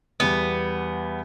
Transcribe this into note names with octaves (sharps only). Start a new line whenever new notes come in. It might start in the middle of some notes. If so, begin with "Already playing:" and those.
E2 G3 B3